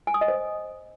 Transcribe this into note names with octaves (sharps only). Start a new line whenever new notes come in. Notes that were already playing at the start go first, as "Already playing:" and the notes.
G#5
D#6
D#5
C5